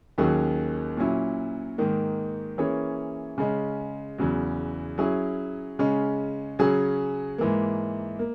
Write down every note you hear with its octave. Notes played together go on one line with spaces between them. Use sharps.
D#2 D#3 F#3 C#4 G#4
A#2 F#3 C#4 E4
G#2 D#3 A#3
E3 A#3 C#4 G#4 C#5
C#3 G#3 C#4
E2 C#3 F#3
F#3 C#4 E4 G#4
C#3 G#3 C#4
C#3 F#3 C#4 G#4
G#2 E3 A#3
A#3